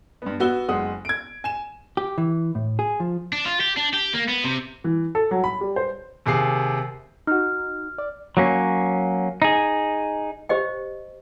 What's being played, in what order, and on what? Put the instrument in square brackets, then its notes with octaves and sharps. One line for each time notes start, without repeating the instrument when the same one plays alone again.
[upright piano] G2 B3
B3 F#4 E6 G7
F#1 G#3 F#5 D#6
G#6 D7
G#5 E7
[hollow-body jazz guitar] G4
E3
A2
G#4
F3
[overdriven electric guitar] D4
F4
G4
D4
G4
A#3
B3
C3
[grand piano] E3
A4
F#3
B5
G3
C5
D#2 C3 G#4 C7
[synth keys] D#4 F#4 [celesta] F6
[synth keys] D5
[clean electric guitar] F#3 A#3 C#4
D#4 G#4
[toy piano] G4 C5 D#5 G5